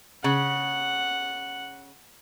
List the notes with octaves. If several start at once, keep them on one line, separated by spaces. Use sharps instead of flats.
C#3 F#5